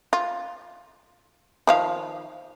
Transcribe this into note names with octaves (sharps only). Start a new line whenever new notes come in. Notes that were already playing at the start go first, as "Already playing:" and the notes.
F4
D#3 F3 F5